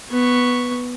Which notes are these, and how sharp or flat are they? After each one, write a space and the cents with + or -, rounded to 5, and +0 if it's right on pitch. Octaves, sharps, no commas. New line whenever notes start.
B3 +0 C#6 +0